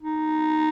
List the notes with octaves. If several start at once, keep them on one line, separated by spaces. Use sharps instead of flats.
D#4